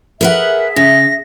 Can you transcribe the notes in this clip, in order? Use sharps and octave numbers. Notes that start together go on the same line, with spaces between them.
G#4 A#4 B4 E5 F#5
C#3 A#6